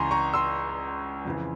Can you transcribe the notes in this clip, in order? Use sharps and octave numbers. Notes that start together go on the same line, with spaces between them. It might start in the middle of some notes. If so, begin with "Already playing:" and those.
Already playing: C#2 C#3 E3 G#5 A#5 C6 C#6
A#5 C#6
C6 E6
F2 C#3 E3